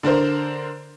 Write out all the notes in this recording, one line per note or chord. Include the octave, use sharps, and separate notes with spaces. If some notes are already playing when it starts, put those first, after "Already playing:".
D3 D4 A#4 C5